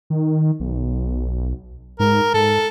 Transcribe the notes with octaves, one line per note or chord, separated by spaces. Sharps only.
D#3
B1
G#2 A#4
G#2 A4